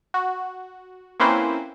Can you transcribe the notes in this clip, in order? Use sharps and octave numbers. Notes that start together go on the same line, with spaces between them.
F#4
A#3 C4 C#4 E4 B4 C5